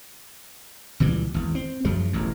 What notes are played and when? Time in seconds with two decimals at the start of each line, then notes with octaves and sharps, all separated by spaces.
1.00 C#2 A#2 E3 G3
1.34 G#1 E2
1.55 C4
1.85 F#2 F3 F#3 G#3
2.13 E1 A1 A2